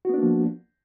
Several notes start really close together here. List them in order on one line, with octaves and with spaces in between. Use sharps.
F#4 B3 D4 A#3 F3